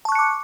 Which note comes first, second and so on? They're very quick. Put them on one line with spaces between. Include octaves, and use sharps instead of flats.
A5 C#6 F#6 C#7 D6